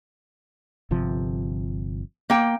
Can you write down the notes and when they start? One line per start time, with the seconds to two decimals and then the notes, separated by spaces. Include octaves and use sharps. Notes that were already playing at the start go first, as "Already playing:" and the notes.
0.91 G1 C3 F3
2.30 A#3 G5